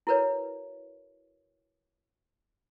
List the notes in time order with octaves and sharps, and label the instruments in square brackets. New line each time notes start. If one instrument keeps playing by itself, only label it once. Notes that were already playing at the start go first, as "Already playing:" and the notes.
[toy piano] E4 F#4 A#4 B4 C#5